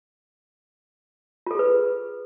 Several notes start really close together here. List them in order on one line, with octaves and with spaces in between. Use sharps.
F4 A4 G#4 B4